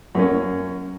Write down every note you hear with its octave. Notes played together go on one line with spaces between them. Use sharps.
F#2 A#3 C#4